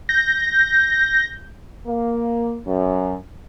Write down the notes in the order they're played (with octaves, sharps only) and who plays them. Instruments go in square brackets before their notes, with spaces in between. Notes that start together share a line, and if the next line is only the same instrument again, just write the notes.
[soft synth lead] G6 [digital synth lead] A#6
[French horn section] A#3
F#2